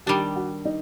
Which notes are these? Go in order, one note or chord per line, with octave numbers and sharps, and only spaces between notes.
D#3 G3 D4 G4
F#4
D#4